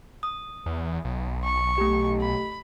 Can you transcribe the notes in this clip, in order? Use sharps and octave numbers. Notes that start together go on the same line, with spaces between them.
D#6
E2
B1
C#6
A3 G4
B5